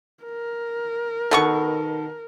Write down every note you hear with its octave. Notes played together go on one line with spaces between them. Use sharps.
A#4
B2 D#3 B3 A4 C#6